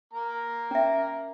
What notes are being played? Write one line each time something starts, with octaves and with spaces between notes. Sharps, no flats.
A#3 A#5
C#4 E5